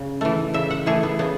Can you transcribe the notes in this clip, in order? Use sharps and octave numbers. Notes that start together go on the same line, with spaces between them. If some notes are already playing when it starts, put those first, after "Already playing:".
Already playing: C#3
E3 A3
C#3 E5
F#5
E3 A3 G#4
B3
C#3 B3